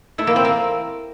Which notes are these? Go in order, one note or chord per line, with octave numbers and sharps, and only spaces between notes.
A3 E4
A#3
C4
A#3